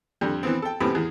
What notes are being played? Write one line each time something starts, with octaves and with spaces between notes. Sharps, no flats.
F2 D3 G3
E3 B3 C4
A4 G5
F#2 A2 B3 C4 G4 B5
E2 G#4